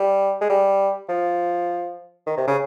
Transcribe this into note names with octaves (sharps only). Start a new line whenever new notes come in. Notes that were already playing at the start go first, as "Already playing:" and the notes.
Already playing: G3
G#3
G3
F3
D#3
C3
C#3